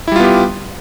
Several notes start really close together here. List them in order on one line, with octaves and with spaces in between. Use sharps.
E4 G3 F4 B3 G4